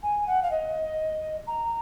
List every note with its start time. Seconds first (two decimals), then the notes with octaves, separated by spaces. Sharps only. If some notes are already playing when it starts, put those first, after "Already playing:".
0.03 G#5
0.27 F#5
0.43 F5
0.51 D#5
1.47 A#5